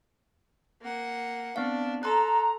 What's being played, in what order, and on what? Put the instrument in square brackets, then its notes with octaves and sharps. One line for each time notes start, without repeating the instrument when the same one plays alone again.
[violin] A#3 F#5
[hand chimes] B3 C4 F5 [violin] D4
[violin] A4 [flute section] A#5 [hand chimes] C6 F#6